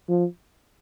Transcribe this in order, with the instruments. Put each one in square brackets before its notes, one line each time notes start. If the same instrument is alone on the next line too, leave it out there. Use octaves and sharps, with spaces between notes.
[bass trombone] F3